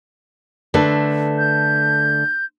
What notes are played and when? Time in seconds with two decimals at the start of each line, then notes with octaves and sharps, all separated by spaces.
0.74 D3 A3 B4
1.38 G6